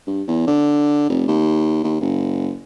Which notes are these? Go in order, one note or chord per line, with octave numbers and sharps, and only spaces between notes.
G2
E2
D3
F1
D#2
D#2
F#1